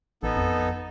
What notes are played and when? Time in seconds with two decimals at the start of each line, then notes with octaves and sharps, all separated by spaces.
0.23 A1 B3 D#4 A4
0.36 F2